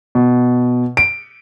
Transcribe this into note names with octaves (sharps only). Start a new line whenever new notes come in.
B2
D7